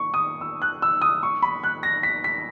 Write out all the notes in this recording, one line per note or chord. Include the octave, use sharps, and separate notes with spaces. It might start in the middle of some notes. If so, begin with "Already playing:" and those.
Already playing: C#6
D#6
E6
F#6
E6
D#6
C#6
B5
F#6
A#6
B6
B6